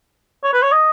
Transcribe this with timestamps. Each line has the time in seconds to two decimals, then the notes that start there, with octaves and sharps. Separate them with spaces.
0.44 C#5
0.53 B4
0.62 C#5
0.72 D#5